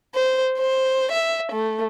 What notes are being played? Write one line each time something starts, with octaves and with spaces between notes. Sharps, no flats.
C5
C5
E5
A3